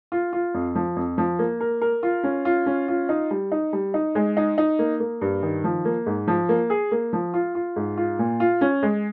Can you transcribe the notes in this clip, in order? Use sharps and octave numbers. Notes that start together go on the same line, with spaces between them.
F4
F4
F2
F3
F2
F3
A#3
A#4
A#4
F4
C#4
F4
C#4
F4
D#4
G3
D#4
G3
D#4
G#3
D#4
D#4
A#3
A#3
G2
D#3
F3
A#3
G#2
F3
A#3
G#4
A#3
F3
F4
F4
G#2
F4
A#2
F4
C#4
G#3